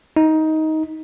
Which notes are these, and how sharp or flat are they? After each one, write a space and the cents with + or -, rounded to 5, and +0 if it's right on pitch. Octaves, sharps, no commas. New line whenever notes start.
D#4 +15